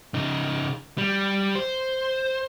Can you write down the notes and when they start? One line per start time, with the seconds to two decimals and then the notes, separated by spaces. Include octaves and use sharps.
0.14 C#3 D#4
0.98 G3
1.55 C5